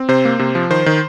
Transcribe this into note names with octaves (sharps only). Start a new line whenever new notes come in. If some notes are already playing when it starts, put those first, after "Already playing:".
Already playing: C4
C3 C5
A#3
C3
F3
D#3 C5
D#3